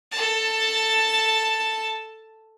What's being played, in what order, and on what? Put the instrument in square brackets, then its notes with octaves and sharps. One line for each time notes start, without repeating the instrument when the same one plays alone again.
[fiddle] A4 A5